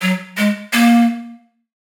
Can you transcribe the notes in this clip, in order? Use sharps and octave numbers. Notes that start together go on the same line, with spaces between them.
F#3
G#3
A#3